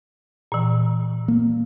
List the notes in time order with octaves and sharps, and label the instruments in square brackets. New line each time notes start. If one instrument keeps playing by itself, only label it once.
[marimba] A#2 E3
[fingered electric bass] A#3